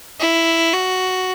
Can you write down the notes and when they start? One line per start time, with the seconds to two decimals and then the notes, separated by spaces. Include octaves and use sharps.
0.20 E4
0.74 F#4